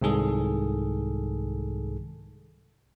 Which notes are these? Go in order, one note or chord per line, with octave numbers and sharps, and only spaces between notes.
C2 G#2 D#3 G#4 A4